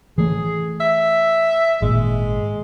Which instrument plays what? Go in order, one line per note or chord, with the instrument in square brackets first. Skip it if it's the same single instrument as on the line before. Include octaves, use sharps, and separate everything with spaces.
[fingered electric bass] E3 A3 [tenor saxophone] G#4
[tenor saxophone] E5
[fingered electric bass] G#1 A#2 [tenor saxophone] G#3